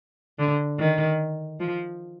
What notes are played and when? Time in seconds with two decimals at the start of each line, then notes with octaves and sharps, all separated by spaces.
0.39 D3
0.79 D#3
1.60 F3